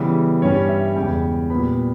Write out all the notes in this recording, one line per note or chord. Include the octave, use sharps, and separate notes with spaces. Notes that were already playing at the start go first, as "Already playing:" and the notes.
Already playing: C#3 E3 G3 B3
G2 G3 C#4 C#5
E5
E2 C#3 G#3 C#4 G5
A#2 G3 B3 B5